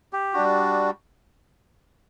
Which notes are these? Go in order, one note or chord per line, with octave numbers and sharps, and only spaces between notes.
G4
G3 D4 F#4